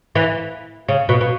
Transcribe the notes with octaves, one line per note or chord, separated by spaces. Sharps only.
E3
C#3
B2
B2